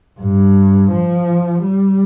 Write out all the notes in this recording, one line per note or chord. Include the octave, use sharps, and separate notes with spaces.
G2
F3
G3